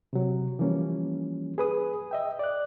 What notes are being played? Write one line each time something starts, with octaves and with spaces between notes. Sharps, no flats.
C3 F#3
E3 F3 G3 A#3 C#4
G#4 B4 D#6
D#5 E5 G5
D5 F#6